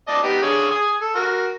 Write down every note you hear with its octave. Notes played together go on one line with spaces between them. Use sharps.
D5 D#5 A5
B3 D#4 G4
D3 G#4 C#5
G#5 D#6
A4
F#4 A#4